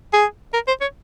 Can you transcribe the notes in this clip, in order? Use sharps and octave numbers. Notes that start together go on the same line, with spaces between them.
G#4
A#4
C5
C#5